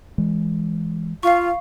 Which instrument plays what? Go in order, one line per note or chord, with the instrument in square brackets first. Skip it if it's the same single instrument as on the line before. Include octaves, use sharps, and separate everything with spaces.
[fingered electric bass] E3 G#3
[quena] F4 [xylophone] F5 C#6